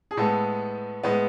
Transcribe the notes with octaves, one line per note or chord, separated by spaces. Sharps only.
G#4
A2 G#3 B3 A4
A2 G#3 B3